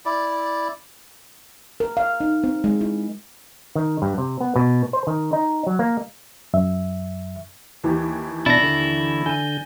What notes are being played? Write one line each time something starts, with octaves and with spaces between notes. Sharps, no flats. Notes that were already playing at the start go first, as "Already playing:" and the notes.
E4 D5
A#4
F5
D#4
C4
G#3
E4
D#3
G2
C3
B3
B2
C5
D#3
D#4
F#3
A#3
F#2 E5
D#2 E3 G4
B2 D4 E4 A6 A#6
D3
D3 G#5 G6 D#7